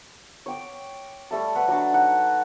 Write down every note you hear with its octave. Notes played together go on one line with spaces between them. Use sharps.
C#5 G5 D6
G3 A3 A5
B4 F#5 B5 C#6
F#3 D4 A5
D#4 F#5